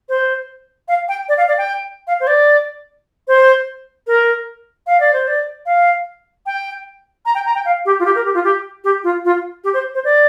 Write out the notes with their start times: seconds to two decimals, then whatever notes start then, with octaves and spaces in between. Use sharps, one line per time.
0.09 C5
0.88 F5
1.08 G5
1.29 D5
1.38 F5
1.48 D5
1.58 G5
2.07 F5
2.20 C5
2.27 D5
3.28 C5
4.07 A#4
4.87 F5
5.00 D5
5.13 C5
5.28 D5
5.66 F5
6.46 G5
7.26 A#5
7.35 G5
7.46 A#5
7.55 G5
7.65 F5
7.86 G4
7.99 F4
8.05 G4
8.15 A#4
8.25 G4
8.34 F4
8.44 G4
8.84 G4
9.04 F4
9.25 F4
9.64 G4
9.74 C5
9.95 C5
10.04 D5